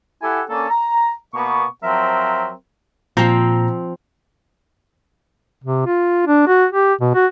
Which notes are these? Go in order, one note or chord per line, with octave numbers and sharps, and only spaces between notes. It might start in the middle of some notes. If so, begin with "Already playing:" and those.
E4 G4 A4 F#5 G#5
A#3 C#4 D4 A4
A#5
B2 A#3 B3 C#6
F3 F#3 C4 A#4 E5
A#2 F3 C4 A#5
C3
F4
D4
F#4
G4
B2
F#4